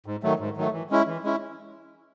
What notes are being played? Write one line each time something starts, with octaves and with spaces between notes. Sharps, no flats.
G#2
D#3 F#3 A3
G#2
D#3 F#3 A3
E3
G#3 C#4 E4
E3
G#3 C#4 E4